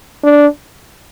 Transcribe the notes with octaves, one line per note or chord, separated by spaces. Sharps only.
D4